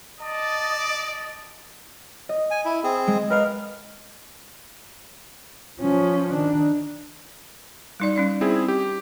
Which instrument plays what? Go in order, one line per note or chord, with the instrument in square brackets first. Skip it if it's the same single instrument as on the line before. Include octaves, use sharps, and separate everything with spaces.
[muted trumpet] D5 [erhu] D#5 [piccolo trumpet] A5
[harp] D#5
[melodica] G#5
E4
C4 G#4
[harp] G#3
[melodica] A#4 [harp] B4 D#5 F5
[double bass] F3 C#4
D#3 D4
[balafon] G3 D#4 D5
G3 C#4 D5
[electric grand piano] C4 E4 G#4
G4